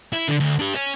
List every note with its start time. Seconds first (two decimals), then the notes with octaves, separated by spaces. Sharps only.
0.13 E4
0.28 D3
0.40 D2
0.59 D4 G4
0.75 C#4